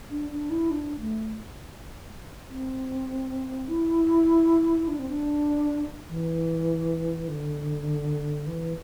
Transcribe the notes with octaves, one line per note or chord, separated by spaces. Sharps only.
D4
D4
E4
D4
A3
C4
E4
D4
C4
D4
E3
D3
E3